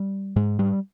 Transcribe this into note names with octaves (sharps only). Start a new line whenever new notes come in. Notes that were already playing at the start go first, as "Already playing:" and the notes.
Already playing: G3
G#2 G#3
G3